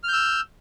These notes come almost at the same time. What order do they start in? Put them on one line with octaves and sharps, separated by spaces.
F6 G6 E6